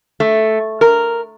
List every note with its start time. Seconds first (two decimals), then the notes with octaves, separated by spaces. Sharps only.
0.20 A3
0.81 A#4